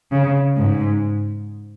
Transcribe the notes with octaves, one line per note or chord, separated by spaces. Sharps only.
C#3
G#2